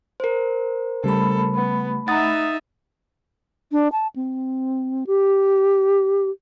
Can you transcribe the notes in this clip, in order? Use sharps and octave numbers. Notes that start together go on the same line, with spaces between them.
A#4 C5
C#3 G3 A3 A4 B5
B3
D#4 E5 F#5 A#5 D#6 A6
D4
A5
C4
G4